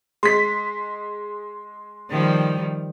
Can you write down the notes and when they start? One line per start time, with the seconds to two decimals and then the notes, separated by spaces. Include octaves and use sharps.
0.23 G#3 C6 B6
2.10 D#3 F3 G3